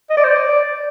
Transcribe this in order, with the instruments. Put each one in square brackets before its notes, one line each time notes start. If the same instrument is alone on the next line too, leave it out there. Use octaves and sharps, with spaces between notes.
[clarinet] D#5
D5
C5
D5